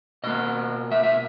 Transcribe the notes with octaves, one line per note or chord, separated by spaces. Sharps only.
B2 A#3 D#5
E5
E5